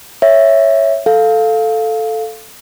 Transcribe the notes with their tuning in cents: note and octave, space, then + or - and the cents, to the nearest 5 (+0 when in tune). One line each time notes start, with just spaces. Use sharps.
C#5 +0 E5 +0
A4 +0 F5 +0